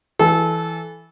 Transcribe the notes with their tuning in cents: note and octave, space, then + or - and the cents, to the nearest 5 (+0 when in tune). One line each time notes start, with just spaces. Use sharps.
E3 +0 A4 -20